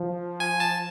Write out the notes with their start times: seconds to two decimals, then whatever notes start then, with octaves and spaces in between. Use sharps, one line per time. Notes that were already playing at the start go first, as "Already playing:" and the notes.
Already playing: F3
0.40 G#5
0.60 A5